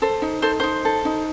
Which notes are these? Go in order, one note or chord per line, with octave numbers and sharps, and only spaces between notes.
A4 C5
D#4
A4 C5
D#4 C5
A4
D#4